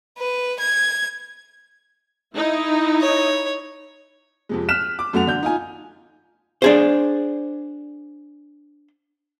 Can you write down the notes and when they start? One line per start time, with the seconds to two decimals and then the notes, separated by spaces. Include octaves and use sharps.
0.18 B4
0.59 G#6
2.35 D#4 E4
3.01 C#5
4.49 F2 C3 G#3
4.69 F6 F#6 B6 E7
4.99 D6
5.13 F#2 A3 F#4 F7
5.27 D3 G6
5.43 D#4 F4 G#5
6.62 D4 G#4 C5